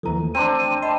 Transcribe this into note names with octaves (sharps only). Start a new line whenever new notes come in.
D#2 E3 F3 A4 A#5
A3
C4 D4 C5 A#5 C6 D#7
D#7
D#5 A5 B5 C6